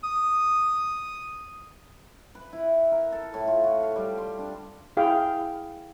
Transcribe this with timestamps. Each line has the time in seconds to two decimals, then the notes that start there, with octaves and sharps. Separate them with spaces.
0.04 D#6
2.35 B4
2.53 E4
2.92 A#4
3.12 A4
3.34 A2
3.47 F4
3.63 F#4
3.83 F5
3.96 G3
4.17 C6
4.39 D4
4.97 E4 G#4 F5 G5